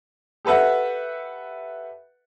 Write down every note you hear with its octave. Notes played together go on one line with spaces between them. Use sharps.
G4 A4 B4 E5 F#5